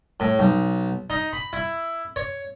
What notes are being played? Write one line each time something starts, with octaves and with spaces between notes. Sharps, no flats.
A2
B1
D#4
B5
E4
C#5